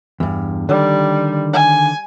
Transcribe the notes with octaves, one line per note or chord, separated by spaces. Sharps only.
E2 G2
D3 D#3 G3
G#5